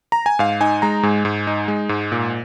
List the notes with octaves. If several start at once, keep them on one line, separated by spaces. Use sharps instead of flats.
A#5
G#5
G#2 F5
D#4 G#5
G#3 A#5
G#2 G#5
G#2
D#4
G#3
G#2
A#2